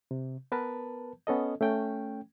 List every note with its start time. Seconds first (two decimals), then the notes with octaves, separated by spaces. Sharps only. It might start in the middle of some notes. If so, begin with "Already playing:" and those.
0.11 C3
0.52 B3 A#4 B4 A5
1.27 B3 C#4 A4 D#5
1.61 A3 C#4 G5